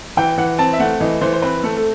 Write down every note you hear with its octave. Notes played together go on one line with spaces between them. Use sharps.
E3 G5
E3 F#5
C4 A5
E5
A3 F#5
E3 D#5
E3 C5
C5
C4 B4
A3 A4
A4